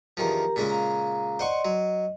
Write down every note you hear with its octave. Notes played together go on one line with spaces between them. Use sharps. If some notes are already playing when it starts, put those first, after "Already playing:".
E2 D#3 F3 G4 A#4 A#5
A#2 C#3 G#3
F5 A#5
C5 D5 D#5 F#5 C6 C#6
F#3 D#5